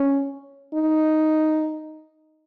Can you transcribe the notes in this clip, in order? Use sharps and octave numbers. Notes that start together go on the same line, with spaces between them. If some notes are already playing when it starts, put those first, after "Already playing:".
Already playing: C#4
D#4